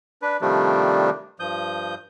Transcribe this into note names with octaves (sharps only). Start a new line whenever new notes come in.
D4 B4
C3 D#3 F3 G3 A3 D4
G2 F3 D#6 G6